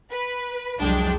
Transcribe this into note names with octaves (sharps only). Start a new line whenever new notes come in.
B4
C2 F2 F#3 G#3 D4 G5